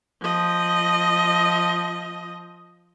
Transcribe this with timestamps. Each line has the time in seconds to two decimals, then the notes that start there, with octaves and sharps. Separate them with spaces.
0.22 F3 D#5